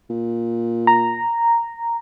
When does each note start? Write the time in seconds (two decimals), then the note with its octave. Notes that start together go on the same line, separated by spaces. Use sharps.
0.10 A#2
0.87 A#5